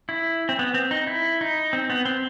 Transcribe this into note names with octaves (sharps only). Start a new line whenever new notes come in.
E4
C4
B3
C4
D#4
E4
D#4
C4
B3
C4